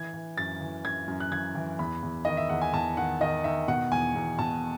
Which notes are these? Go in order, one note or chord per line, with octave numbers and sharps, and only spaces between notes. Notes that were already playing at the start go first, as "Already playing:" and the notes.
Already playing: E3 G#6
E3
F#2 A6
E3
F#2 G#6
F#2
F#6
E3 G#6
E3
E2 B5
E2
D#3 D#5
E5
E2 F#5
G#5
E2 A5
D#3 F#5
D#3 D#5
D#3 E5
B2 F#5
E2 G#5
E2
B2 A5